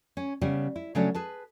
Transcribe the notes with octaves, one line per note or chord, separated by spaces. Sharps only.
C#4
C#3 G3 B3 F#5
E4
C#3 F#3 A3 C#4 D4
G#4 B4 A5